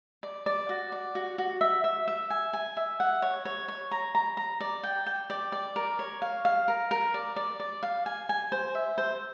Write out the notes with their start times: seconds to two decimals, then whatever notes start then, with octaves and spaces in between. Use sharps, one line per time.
0.23 D5
0.46 D5
0.69 F#4
0.92 D5
1.15 F#4
1.38 F#4
1.61 E5
1.84 E5
2.08 E5
2.30 G#5
2.53 G#5
2.77 E5
3.00 F#5
3.22 C#5
3.45 C#5
3.68 C#5
3.91 A#5
4.15 A#5
4.37 A#5
4.61 D5
4.83 G5
5.06 G5
5.30 D5
5.52 D5
5.76 A#4
5.99 C#5
6.22 F5
6.45 F5
6.68 A#4
6.91 A#4
7.14 D5
7.36 D5
7.60 D5
7.83 F5
8.06 G#5
8.29 G#5
8.52 C5
8.75 E5
8.98 C5